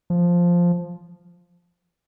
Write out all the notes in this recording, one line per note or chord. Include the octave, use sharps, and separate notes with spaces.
F3